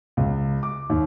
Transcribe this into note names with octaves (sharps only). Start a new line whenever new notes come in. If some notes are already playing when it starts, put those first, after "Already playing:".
C#2
D6
D#2